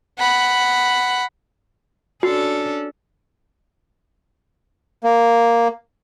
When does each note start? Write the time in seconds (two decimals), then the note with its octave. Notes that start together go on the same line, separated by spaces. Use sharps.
0.18 F#5 B5
2.23 C#4 D4 F#4 A4
5.04 A#3